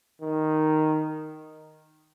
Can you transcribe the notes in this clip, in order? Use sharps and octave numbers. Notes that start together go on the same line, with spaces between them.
D#3